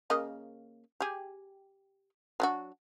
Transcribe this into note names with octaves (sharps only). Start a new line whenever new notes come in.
C#3 A#3 D#5
G4 G#4
F#3 D4 F#4